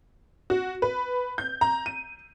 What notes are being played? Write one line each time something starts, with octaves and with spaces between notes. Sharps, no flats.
F#4
B4
G6
A#5
D#7